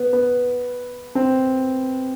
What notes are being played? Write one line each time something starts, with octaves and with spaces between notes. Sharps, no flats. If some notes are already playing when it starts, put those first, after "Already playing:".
Already playing: B3
B3
C4